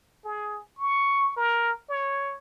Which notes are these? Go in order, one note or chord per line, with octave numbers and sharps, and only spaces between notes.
G#4
C#6
A#4
C#5